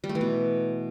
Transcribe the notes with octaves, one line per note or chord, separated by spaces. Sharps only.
G3
A3
E3
B2